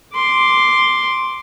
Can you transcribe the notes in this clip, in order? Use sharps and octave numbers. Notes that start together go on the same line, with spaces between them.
C6 D6